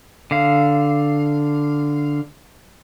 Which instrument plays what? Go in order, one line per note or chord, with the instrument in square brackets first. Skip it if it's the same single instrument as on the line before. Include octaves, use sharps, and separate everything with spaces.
[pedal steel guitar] D3 F5